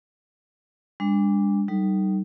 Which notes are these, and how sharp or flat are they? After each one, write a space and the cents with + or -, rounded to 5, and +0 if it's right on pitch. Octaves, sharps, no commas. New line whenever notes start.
G#3 -45 D4 -10
G3 -30 D#4 -15 A4 +0